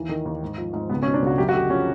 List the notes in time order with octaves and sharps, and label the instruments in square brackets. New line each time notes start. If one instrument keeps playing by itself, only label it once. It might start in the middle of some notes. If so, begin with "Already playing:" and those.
Already playing: [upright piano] D#2 E3
D#3
D#2
G#2
F3
G#2
C#2 B3
C#4
B2
D4
C#2 F#4
F#2 G4
F#4
D3 G4
F3 C#4